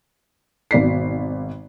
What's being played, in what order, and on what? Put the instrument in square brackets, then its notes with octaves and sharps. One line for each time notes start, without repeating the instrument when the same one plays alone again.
[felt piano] G#1 B2 D5 B6 C7